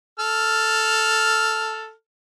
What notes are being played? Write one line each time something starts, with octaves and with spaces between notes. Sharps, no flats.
A4 F6